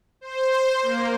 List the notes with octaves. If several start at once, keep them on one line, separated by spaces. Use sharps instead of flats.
C5
A#3